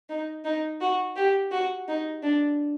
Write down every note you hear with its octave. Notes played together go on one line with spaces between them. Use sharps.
D#4
D#4
F#4
G4
F#4
D#4
D4